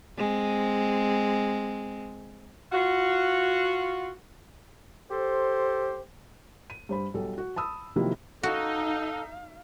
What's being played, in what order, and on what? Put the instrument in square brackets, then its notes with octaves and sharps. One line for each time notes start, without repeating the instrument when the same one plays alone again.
[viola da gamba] G#3 C4
[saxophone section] F4 F#4
[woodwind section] G4 A4 C5
[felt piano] D#7
G2 C5 B5
B1 G3 A4
F#4
A5 B5 D#6 E6
C3 D#3 F3 F#3 A#3 E4
[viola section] D#4 [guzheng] F#4 [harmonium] A4 [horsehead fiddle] F5